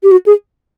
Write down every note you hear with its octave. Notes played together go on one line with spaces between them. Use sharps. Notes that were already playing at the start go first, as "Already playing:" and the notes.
G4
F#4
G#4